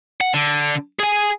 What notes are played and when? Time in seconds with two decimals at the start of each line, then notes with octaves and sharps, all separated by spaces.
0.21 F#5
0.34 D3
0.99 G#4 G#5